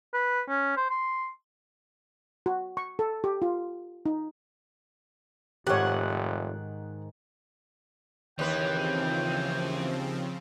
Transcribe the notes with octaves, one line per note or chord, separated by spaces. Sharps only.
B4
C#4
C5
C6
F#4
C#6
A4
G4
F4
D#4
F1 G#2 D#3 G4 C#5 F#5
D#2 C#3 E3 F3 C4 B4 G5